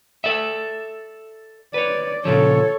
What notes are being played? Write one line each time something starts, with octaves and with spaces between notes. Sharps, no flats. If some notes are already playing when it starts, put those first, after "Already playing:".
A4 D5 E5
B4 C#5 D5
A#2 C#3 F3 A4 C#5